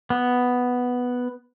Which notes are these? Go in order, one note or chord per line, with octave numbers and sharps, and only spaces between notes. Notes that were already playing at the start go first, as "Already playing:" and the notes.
B3